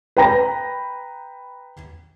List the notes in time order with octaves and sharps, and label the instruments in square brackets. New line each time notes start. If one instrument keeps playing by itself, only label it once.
[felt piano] B4 G5 A#5 A#6